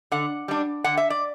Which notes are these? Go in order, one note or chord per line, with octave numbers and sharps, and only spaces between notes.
D3 F#5
G3 D4
D3 F#5
E5
D5